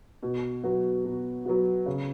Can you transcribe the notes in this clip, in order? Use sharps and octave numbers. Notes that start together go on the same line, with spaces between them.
B2
F#3 B3 F#4
B2
F#3 B3 F#4
C#3